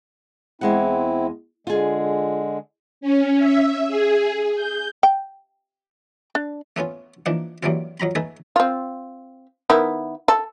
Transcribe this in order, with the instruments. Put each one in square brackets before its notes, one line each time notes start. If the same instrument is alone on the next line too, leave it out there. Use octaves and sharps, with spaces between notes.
[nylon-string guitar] E2 G#3 F#5 [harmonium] C4 E4
[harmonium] D3 G#3 [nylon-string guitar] F4 G#4
[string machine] C#4
E5
G#4
G6
[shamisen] G5
D4
[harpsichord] A3 B3 C#4 F4
E3 F3 A#3 D4 D#4
F#2 E3 G3 A#3 C4 F4
F2 F#3 A#5 B5
A3 D#4 G#4 A4 B4
[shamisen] C4 F4
D#3 B3 E4
A4